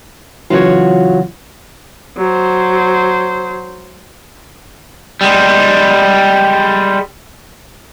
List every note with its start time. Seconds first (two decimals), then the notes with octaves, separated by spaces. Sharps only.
0.50 C#3 E3 F#3 F4 F#4 C#5
2.18 F#3 C5
5.21 G3 G#3